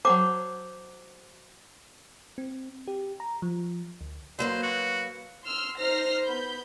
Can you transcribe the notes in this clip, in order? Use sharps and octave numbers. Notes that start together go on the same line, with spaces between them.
F#3 C4 C5 A5 D6
C4
G4
A#5
F3
D2
F#3 A#3 B4 C5
F#4
C6 E6 F6
D#4 C5 F6 A#6 C7
B3 B5 G6